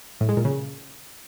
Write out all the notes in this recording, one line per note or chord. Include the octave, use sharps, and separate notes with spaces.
A2
G#3
A#2
C#3